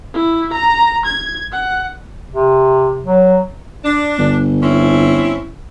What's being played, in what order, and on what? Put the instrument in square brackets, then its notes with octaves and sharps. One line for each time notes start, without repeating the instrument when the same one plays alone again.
[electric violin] E4
A#5
G#6
F#5
[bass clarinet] C3
F#3
[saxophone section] D4
[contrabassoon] G1
[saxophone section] C4 C#4 E4